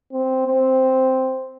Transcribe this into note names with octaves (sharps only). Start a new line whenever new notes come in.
C4
C4